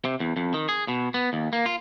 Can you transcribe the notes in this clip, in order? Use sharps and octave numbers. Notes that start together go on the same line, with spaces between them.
C3
E2
F2
D#3
G#4
B2
B3
D#2
A#3
F4